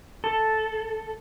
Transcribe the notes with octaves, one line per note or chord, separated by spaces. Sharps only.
A4